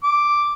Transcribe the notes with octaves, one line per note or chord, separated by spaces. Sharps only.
D6